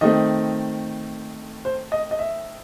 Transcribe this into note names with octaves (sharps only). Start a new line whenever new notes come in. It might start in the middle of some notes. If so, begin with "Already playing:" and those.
D#3 A3 C4 D#5
C5
D#5
D#5
E5